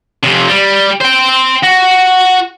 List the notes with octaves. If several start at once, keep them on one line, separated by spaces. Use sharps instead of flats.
F2 C3
G3
C5 G5
F#4